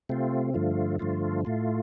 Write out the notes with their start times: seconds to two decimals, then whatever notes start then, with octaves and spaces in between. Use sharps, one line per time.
0.09 C3 A3 C4 F4
0.54 G2 D3 F3 A3 F4
0.99 G2 D3 F3 A3 F4
1.45 A2 A3 F4